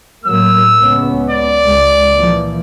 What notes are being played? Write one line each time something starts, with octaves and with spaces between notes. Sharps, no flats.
A2 F#3 A#3 E6
C#2 B3 C#4
D5
C#2 G#3
A#2 E3 F3